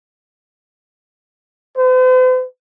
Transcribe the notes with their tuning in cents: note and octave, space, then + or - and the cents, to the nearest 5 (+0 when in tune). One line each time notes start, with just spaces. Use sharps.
C5 -45